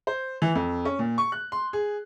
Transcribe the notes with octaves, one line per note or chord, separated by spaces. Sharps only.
C5
E3
F2
C#4
A#2
C#6
F#6
C6
G#4